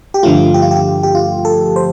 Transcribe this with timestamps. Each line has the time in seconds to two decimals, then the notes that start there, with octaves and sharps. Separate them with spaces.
0.14 G4
0.23 G2 D3 F3 A3 F4
0.54 G4
0.62 F4
0.71 G4
1.03 G4
1.15 F4
1.45 A4
1.76 C5